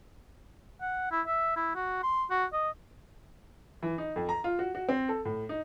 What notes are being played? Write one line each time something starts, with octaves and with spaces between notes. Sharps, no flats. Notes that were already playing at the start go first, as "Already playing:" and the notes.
F#5
E4
E5
E4
F#4
C6
F#4
D#5
E3
D#4
F2
A#5
F4
F#4
F#4
C4
A4
A2
D#4